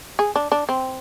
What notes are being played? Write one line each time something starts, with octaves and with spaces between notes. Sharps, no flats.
G#4
D4
D4
C4